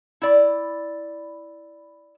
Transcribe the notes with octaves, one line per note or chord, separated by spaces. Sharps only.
E4 D5